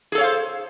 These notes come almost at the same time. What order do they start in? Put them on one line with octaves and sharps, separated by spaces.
G#4 A4 C#5 F5 C5